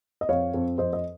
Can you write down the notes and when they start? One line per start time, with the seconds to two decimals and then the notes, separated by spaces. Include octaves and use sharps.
0.21 D#5
0.29 F2 C#5 F5
0.54 F2
0.78 F2 C5 D#5
0.93 D#5